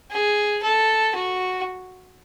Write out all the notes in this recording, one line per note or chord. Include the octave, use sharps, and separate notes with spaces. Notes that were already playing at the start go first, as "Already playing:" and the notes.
G#4
A4
F#4